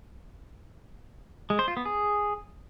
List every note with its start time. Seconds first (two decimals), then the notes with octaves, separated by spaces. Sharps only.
1.50 G#3
1.59 C5
1.68 F4
1.77 B3
1.85 G#4